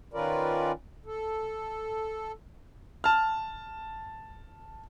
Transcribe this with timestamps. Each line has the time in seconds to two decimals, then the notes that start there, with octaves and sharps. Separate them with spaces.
0.14 D#3 C#4 F4 A#4 B4 D5
1.06 A4
3.04 A5 F6